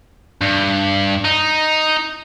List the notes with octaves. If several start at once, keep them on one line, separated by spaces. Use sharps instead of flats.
G2
D#4